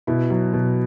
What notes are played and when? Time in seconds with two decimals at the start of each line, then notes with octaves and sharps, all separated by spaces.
0.07 B2 E4
0.30 F#3
0.53 B2